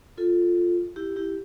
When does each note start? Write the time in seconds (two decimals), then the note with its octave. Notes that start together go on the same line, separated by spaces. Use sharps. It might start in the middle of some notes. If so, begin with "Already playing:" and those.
0.18 F4 A4
0.96 E4 G4
1.16 E4 G4